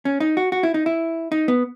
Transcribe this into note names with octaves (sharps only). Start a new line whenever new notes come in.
C#4
D#4
F#4
F#4
E4
D#4
E4
D#4
B3